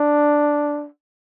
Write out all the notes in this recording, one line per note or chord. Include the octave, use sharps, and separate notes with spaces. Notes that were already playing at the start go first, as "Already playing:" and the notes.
Already playing: D4